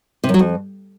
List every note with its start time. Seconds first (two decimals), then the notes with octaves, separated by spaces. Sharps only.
0.24 C3
0.29 F#2
0.34 F#3
0.39 F2